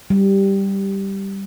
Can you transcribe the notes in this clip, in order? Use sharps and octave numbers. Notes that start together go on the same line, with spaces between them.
G3